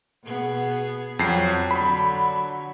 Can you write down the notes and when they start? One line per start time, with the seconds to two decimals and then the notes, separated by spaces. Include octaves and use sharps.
0.24 B2 B3 G#4
1.19 F2 F#3 C7
1.71 D3 F#3 B5